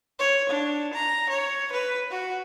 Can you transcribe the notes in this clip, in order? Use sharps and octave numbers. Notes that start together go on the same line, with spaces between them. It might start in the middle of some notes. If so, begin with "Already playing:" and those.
C#5
D4
A#5
C#5
B4
F#4